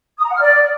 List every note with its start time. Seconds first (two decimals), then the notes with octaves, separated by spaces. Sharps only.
0.18 D#6
0.24 A#5
0.29 F#5
0.35 F6
0.41 D5